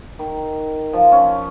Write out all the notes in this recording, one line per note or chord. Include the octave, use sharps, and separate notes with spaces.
D#3
F3
C#4